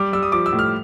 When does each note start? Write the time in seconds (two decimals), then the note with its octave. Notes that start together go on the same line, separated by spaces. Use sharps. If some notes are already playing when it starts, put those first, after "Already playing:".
Already playing: G3 D6
0.13 G3 E6
0.23 D#6
0.32 F3 D6
0.46 E6
0.53 A2
0.59 F6